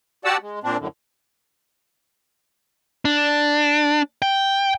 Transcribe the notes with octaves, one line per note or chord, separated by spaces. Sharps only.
F#4 G4 D5 F#5 A5 E6
G#3
A#2 C4 D4
F#2 A2 D3
D4
G5